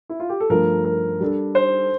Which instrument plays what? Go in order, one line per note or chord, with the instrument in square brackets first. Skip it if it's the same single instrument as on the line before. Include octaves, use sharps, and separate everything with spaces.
[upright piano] E4
F4
G4
A4
[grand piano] G2 F3 A3 [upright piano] A#4
[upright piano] A#4
[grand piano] G3 D4 A4
[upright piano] C5